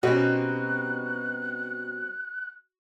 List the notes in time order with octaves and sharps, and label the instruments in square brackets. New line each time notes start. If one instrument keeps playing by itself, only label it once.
[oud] B2 C#4 [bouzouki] G3 C4 D#4 [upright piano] F#4 [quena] F#6